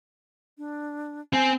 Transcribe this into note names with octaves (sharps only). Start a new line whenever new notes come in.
D4
C4 G#5